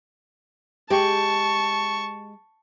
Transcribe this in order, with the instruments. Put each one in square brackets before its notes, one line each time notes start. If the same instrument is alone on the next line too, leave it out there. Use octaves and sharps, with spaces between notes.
[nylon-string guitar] G#3 G4 [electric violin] A5 [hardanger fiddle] C#6